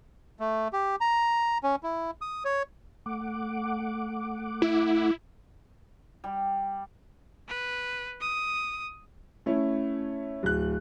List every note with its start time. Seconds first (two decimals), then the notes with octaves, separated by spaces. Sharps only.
0.40 A3
0.73 G4
1.01 A#5
1.64 C#4
1.83 E4
2.21 D#6
2.45 C#5
3.06 A3 F#5 D6
4.62 E4
6.24 G3
7.48 B4
8.20 D#6
9.46 A3 C#4 E4
10.43 D1 F#6